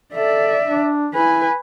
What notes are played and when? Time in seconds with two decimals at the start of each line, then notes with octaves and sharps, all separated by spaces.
0.14 A4 D5 E5
0.67 D4
1.14 E4 B4 G#5